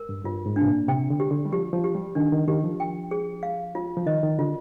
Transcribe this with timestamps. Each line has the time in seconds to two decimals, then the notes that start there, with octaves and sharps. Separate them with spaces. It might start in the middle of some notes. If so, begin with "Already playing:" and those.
Already playing: A#4
0.09 G2
0.25 G2 F4
0.46 G#2
0.56 D4
0.62 C3
0.67 A#2
0.88 C3 G5
1.10 D3
1.20 G4
1.31 D3
1.46 G3
1.52 F3 G4
1.73 F3
1.84 G4
1.95 G3
2.15 D#3 D4
2.32 D#3
2.48 D#3 G4
2.64 F3
2.80 G5
3.11 G#4
3.43 F5
3.75 F4
3.97 F3
4.06 D#3 D#5
4.23 D#3
4.39 D3 F4